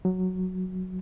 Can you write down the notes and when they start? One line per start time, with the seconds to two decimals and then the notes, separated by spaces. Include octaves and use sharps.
0.05 F#3